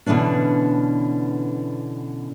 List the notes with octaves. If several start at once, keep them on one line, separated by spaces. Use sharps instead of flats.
B2 D3 E3 C#4 D4